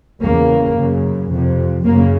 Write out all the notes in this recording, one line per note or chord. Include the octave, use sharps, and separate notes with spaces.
E2 C#3 A#3
F#2 C#3
F2 C3
F#2 C#3 A#3